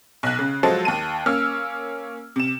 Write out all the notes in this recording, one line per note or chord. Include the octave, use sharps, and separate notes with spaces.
B1 F#6
C#3
F3 F#3 G#3 A4 C5
D#2 A5 D#7
A#3 C#4 E6 F6
C3 E7